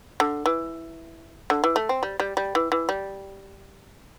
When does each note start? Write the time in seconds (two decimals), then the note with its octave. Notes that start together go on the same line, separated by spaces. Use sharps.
0.20 D3
0.46 E3
1.50 D3
1.64 E3
1.76 A3
1.89 C4
2.03 G3
2.20 G3
2.37 G3
2.55 E3
2.72 E3
2.89 G3